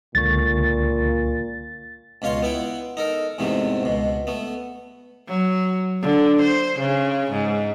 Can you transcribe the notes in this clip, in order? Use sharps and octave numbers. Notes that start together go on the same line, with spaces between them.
C#2 A#2 D3 C#6 A6
C#2 B2 F4 C#5 C6
B3 E4 F#5 G5
D#4 A4 A#4
E2 G#2 C3 A3 B3
C#2 B2
A3 B3
F#3
D3
C5
C#3
G#2